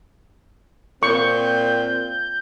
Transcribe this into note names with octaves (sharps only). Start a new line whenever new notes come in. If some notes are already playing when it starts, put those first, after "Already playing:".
A#2 C4 C#6 G6